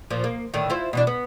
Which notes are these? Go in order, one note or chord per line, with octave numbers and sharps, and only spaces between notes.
A#2 F3
A#3
A2 D3 D#3
E4 F4 C5
B2 E3 D4
B3